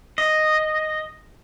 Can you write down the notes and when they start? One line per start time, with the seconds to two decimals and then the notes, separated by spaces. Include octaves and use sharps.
0.18 D#5